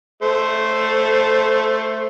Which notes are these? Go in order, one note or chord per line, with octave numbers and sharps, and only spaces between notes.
A3 C5